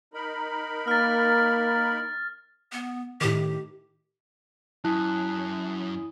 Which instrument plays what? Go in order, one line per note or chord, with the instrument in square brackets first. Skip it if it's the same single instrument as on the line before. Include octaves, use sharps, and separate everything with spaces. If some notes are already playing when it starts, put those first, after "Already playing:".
[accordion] D#4 A#4 B5
[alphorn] A#3 [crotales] F6 A6
[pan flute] B3
[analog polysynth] A2 D#3 [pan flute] G4
[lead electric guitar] F#2 [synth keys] E4 G#5 D#6 [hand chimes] A5 F#6